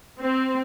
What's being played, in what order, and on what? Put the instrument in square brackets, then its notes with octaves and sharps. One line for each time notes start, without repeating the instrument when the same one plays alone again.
[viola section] C4